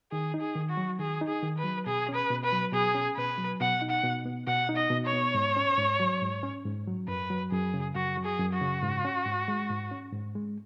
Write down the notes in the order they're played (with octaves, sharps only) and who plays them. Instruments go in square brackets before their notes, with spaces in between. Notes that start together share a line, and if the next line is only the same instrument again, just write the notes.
[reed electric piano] D#3 [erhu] G#4
[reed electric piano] D#4
[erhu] G#4
[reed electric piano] D#3
[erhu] F#4
[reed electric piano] F#3
[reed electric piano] D#3 [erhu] G#4
[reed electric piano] D#4
[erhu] G#4
[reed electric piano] D#3
[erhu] B4
[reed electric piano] F#3
[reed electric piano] B2 [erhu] G#4
[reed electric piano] C#4
[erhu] B4
[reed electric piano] B2
[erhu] B4
[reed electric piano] F#3
[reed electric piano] B2 [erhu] G#4
[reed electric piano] C#4
[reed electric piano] B2 [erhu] B4
[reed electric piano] F#3
[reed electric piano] B2 [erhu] F#5
[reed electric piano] D#4
[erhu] F#5
[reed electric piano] B2
B3
[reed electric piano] B2 [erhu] F#5
[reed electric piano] D#4
[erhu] D#5
[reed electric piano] B2
[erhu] C#5
[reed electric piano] B3
G#2
C#4
G#2
F#3
G#2
C#4
G#2
F#3
[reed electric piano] F#2 [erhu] B4
[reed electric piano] F#3
[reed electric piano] F#2 [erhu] G#4
[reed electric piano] C#3
[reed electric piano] F#2 [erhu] F#4
[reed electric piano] F#3
[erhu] G#4
[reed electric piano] F#2
[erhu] F#4
[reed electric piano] C#3
G#2
C#4
G#2
G#3
G#2
C#4
G#2
G#3